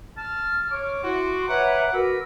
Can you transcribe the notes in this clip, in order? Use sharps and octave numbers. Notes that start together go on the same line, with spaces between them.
A5 F6
C#5 D6
E4 F#4 C6
B4 C#5 E5 F#5 A#5
F#4 A#4 B4 E6